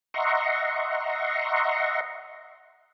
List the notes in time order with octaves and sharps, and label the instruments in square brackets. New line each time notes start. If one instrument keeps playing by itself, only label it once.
[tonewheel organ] D#5 E5 F#5 A#5 C6 C#6